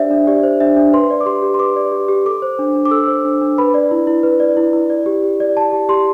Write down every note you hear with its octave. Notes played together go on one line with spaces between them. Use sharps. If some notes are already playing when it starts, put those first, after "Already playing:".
Already playing: D4 G4 C5 D5 E5
D4
G4 D5
C5
D4 E5
D4
B4 C6
D5
D6
G4 C6
G4
C6
B4 D6
D5
G4
G4
A4 D6
C5
D4
D4
D6
A4 E6
C5
D4
D4
B4 B5
D5
E4
E4
B4
D5
E4
E4
D5
G4
G4
D5
D5 A5
G4
G4 C6